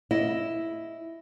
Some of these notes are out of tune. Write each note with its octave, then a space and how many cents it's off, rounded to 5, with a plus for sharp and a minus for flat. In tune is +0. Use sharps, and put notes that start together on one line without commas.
E4 +0 D#5 +0